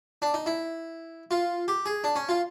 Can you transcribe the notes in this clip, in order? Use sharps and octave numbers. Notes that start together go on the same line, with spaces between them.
D4
D#4
E4
F4
G4
G#4
D4
C#4
F4